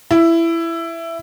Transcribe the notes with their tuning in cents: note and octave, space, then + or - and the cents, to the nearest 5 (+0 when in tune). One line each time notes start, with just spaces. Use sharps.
E4 +15